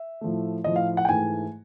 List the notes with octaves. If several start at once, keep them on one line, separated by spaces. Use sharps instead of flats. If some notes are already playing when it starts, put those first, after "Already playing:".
Already playing: E5
A2 F3 A3
A2 F3 A3 D#5
F5
F#5
G5
G#2 E3 A3 G#5